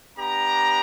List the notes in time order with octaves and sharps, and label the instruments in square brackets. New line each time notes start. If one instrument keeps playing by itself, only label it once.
[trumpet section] B3 D4 G4 A#5